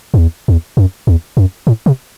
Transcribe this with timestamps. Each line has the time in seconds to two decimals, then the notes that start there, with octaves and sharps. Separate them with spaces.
0.14 F#2
0.18 E2
0.48 E2
0.77 F#2
1.07 E2
1.37 F#2
1.67 A2
1.86 C3